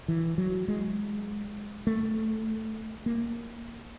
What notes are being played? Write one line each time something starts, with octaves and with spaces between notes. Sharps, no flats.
E3
F#3
G#3
A3
A#3